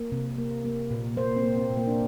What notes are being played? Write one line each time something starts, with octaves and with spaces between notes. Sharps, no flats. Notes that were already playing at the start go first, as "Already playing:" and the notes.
Already playing: A#3
C3
A#3
A#3
A#2
A#3 C5
C4
A#3
C4
A#2
A#3
D4